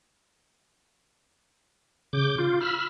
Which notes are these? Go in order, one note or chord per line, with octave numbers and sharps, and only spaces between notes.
C#3 D6 G6
F4
B5 E6 F6